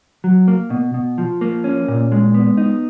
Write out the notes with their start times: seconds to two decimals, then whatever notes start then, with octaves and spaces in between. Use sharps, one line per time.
0.24 F#3
0.48 A#3
0.70 B2
0.94 B2
1.18 F3
1.41 A#3
1.64 C#4
1.88 A#2
2.12 G#3
2.34 B3
2.57 D#4